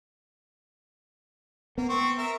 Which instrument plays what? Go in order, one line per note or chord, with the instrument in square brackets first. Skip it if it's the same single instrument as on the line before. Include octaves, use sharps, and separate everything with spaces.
[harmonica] A#3 [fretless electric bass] B3
[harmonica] C4 C#6
A#4 E5